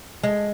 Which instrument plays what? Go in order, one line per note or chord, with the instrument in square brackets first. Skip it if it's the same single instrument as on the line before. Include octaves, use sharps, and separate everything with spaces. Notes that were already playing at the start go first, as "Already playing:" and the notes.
[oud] G#3